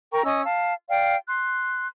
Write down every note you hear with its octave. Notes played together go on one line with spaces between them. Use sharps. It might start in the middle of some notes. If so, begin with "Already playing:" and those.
A#4 G5 A#5 C#6
C#4 D#5 D#6 E6
F5 A5
D5 F5 G5
C6 F#6